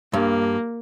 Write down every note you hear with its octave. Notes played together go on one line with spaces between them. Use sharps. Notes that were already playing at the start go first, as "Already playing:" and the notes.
G2 A#3